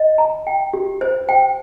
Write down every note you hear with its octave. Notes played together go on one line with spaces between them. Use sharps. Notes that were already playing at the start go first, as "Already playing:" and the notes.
Already playing: D#5
A#5
G5
G4
C5
G5